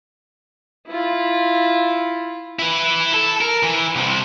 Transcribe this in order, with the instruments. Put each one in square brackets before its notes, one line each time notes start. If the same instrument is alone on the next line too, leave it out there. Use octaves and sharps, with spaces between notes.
[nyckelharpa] E4 F4
[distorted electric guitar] E4 B4
A4
A#4
E3
C2 C3